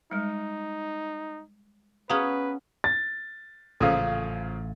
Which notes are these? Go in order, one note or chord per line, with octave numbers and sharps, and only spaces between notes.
G3 G#3 D#4
B3 C#4 F#4 G#4 B4 F5 A#5 D#6
A6
A1 A#2 C#3 F3 A4 F5